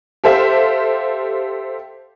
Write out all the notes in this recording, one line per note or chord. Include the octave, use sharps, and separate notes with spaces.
G4 A4 C5 E5 F5